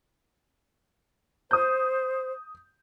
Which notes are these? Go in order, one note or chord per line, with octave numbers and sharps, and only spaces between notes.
C5 D#6 G6